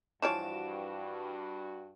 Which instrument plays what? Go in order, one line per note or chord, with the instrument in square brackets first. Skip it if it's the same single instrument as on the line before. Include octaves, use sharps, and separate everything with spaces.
[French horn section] G2 F#4 [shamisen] E3 F3 C#5 [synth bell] A5 D7 E7